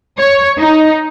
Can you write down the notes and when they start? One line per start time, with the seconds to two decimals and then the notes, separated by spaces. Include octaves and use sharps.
0.18 C#5
0.59 D#4